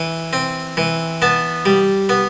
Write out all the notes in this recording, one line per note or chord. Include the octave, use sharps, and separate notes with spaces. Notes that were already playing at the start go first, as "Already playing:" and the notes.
Already playing: E3
C4
E3
B3 A5
G3
B3